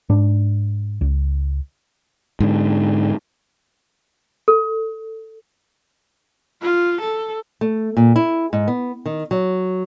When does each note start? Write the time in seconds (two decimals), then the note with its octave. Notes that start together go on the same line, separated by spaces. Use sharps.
0.09 G#2 D4
1.01 C#2
2.40 G#2 D3
4.48 A4
6.62 F4
7.01 A4
7.61 A3
7.97 A#2
8.16 E4
8.53 G#2
8.68 B3
9.06 D#3
9.31 F#3